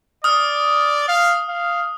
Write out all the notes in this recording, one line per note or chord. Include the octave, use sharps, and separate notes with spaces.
D5 D#6 F6
F5
F5